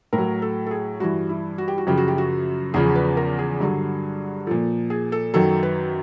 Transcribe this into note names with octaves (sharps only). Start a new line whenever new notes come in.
A2 A#4
F#3
A4
A4
G#4
G2 E3 F#4
E4
F#4
G4
F#4
F#2 C#3 F3 G4
F#4
G4
F#4
E2 C#3 F3 G#4
B4
A#4
G#4
G2 D3 F#3
A#2 F3 A4
G#4
A4
F#2 D#3 F#3 A4
B4